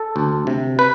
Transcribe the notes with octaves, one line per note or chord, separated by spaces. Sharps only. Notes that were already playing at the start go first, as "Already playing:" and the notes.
Already playing: A4
D2
C3
B4